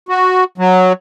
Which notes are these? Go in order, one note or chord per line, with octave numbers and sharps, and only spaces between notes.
F#4
F#3